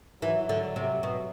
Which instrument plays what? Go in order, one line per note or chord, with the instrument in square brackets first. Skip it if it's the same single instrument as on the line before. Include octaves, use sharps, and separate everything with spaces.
[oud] E3 [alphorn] F#3
[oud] D3
C3
B2